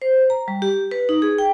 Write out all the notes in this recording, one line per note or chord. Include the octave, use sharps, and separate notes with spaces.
C5
A#5
G3
G4
B4
D#4
G#4
G5